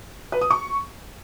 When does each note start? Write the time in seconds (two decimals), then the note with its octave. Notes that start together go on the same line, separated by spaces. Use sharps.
0.32 B4
0.41 D#6
0.51 C#6